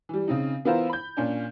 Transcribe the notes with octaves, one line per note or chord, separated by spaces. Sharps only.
E3 G3
C#3 C4 D#4
E3 B3 E4 F4 A#4 C5
B5 G6
A#2 C#4 D4